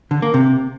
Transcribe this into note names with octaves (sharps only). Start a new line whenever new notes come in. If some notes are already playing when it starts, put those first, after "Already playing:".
D3
A#3
C3